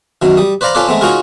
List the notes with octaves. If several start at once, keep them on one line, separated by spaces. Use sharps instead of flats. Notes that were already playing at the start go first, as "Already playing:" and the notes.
F#2 B2 D#3
G3 D#6
B4 C5 D5 F5 A#5 B5
C#4 F4 A4 B4 C5 D5
G#3 A3 B3 C4
C#4 D#4 F4 F#4 G#4 A#4